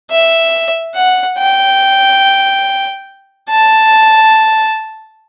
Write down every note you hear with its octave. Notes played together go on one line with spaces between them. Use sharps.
E5
F#5
G5
A5